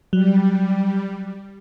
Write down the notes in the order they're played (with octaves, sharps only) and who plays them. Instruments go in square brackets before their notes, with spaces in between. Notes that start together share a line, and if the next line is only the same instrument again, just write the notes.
[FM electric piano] F#3 [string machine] G3